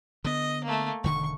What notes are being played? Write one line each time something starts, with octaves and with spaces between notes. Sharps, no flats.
D3 B3 D#5
A3 A#3
E1 D3 D#3 C#6